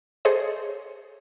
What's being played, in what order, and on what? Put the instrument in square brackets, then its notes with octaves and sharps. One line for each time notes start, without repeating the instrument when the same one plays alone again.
[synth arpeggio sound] G#4 A4 C5 C#5 D#5